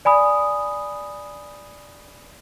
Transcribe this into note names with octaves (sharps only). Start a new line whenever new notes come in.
D5 G#5 B5 D#6